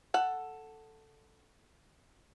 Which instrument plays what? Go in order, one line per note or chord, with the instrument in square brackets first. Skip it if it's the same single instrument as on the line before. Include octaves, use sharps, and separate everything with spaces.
[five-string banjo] A4 F#5